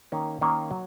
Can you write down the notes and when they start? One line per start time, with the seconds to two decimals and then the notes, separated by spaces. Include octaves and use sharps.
0.12 D#3 A#3 C#4
0.41 D#3 A#3 C#4
0.71 F#3